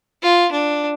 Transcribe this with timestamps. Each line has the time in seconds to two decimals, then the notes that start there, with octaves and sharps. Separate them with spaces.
0.22 F4
0.52 D4